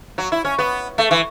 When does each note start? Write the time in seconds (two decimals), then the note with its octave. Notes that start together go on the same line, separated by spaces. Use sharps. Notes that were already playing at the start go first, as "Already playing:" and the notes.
0.18 F#3
0.32 E4
0.45 C#4
0.59 B3
0.98 A3
1.11 E3